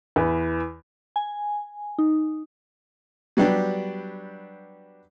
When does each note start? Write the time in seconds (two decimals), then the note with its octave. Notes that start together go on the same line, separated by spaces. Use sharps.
0.16 E2 B4
1.16 G#5
1.99 D#4
3.37 F#3 G3 B3 D4 G4